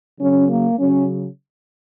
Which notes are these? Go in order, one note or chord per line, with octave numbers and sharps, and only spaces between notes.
C#3 F#3 C#4
A#3
C#3 F#3 C#4